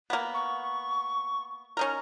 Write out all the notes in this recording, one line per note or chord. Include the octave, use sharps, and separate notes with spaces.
A#3 B3
C#6
C#4 D#4 A#4